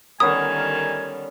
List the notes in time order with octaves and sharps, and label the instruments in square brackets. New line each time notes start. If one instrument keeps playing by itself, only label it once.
[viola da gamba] D3 D#3 G3 [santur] B3 C#4 A#4 [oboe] G#5 [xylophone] D#6